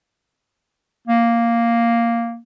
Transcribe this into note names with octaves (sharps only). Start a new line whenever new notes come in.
A#3